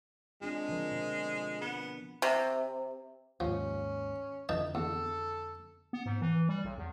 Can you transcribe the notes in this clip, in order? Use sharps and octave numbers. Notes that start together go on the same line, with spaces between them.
G#3 C4 D4 F4
D3 F3 A#4
B2
B3
C3
D#2 G#2 F3 C#4
F2 D3 E3 D#4 A5
E2 A4
B3
G#2
E3
G3
B1
E2